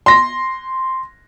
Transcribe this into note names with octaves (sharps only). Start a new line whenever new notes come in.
C6 A#6